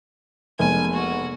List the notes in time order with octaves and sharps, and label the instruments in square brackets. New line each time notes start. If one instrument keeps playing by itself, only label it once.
[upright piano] F1 [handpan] G#3 A#3 B3 [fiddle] G#5
[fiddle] F#4